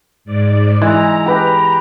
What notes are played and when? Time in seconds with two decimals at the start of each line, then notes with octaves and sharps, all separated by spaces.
0.25 G#2 D5
0.82 E3 G#3 A#5
1.26 G4 B4 G5